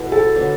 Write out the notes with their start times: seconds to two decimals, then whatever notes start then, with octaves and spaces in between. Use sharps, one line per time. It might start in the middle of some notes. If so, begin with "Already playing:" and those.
Already playing: B2 A3 E4
0.12 A4
0.35 D3 F#3 B3